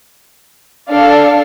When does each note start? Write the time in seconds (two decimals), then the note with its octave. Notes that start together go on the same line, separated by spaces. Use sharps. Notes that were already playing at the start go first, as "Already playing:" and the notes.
0.90 D4 A4 D5 F5